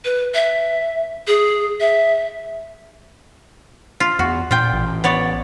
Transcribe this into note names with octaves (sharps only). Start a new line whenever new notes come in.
B4
E5
G#4
E5
F4
E2 F#4
A#2 F4 G5
A1
B3 C#5 D5